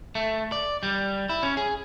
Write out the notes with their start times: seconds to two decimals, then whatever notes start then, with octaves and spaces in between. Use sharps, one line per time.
0.15 A3
0.52 D5
0.83 G3
1.29 E4
1.43 C#4
1.57 G#4